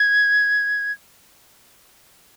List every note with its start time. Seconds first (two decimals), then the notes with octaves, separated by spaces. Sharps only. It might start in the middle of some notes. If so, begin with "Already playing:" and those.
Already playing: G#6